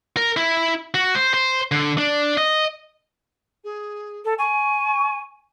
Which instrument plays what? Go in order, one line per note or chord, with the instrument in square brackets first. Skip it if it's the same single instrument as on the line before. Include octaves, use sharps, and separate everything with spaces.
[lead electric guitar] A#4
E4
F#4
C5
C5
D3
D4
D#5
[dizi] G#4
[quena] A4
[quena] G#5 [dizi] C#6